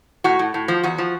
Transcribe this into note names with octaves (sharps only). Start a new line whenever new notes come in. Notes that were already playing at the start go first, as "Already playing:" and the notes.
A2 F#4
A2
A2
F3
E2 F#4
F3